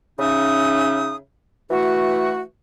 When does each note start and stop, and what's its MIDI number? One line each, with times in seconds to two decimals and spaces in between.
0.19 1.15 49
0.19 1.15 61
0.19 1.15 63
0.19 1.15 76
0.19 1.15 87
1.70 2.40 52
1.70 2.40 57
1.70 2.40 66